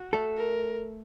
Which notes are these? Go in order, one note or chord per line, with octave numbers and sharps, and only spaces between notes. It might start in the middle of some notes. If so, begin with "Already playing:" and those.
Already playing: F#4
A3 A4
A#4